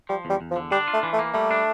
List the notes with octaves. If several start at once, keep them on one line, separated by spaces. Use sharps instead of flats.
F3 G3
E2 G3
E2
F3
D3
G3 D4
F4
A3
E3
A3
A#3
G3 A3
D4